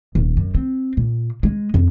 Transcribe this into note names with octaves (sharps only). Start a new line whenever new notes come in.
D#1
F#2
C4
A#2
G#3
F2